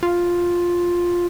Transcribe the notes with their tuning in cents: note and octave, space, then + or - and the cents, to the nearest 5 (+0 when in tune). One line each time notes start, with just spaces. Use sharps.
F4 +5